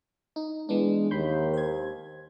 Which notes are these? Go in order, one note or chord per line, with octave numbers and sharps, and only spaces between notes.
D#4
E3 G#3 B3 D4
D#2 B5 C6 G6
C5 G#6